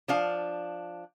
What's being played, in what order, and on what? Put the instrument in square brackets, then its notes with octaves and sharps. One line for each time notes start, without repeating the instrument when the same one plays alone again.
[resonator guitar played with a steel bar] F3 D4 F5